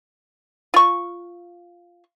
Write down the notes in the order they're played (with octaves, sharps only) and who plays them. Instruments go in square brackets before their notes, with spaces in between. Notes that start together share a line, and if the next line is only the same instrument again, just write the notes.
[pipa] F4 C#6